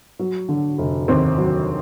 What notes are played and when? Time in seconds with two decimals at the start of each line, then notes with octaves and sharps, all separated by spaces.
0.19 F#3
0.49 D3
0.78 F1
1.08 D#2 C4
1.38 F#3